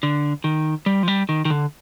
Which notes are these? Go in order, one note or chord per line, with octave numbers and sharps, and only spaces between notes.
D3
D#3
G3
F3
G3
D#3
D#3
D3